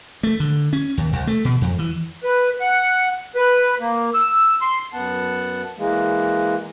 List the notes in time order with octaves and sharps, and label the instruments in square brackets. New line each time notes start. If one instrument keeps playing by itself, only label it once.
[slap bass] A3
D3
C#4
D#2
C2
A3
B2
F2
E3
[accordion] B4
F#5
B4
A#3
E6
C6
[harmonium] F#2 B3 F#5 A5
E3 G#3 A#3